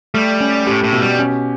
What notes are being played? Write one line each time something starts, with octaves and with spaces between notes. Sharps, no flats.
G3 A3
C#4
A2 G4
A2
B2
G3
C#4